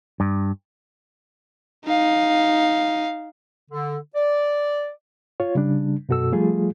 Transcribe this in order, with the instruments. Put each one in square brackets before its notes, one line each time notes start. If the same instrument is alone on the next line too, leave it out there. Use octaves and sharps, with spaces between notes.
[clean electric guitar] G2
[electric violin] D#4 F5
[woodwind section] D3
D5
[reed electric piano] F4 C#5
C#3 G3 D4
F#2 B2 F#4 A4 E6
F3 G3 A3 F4 G#4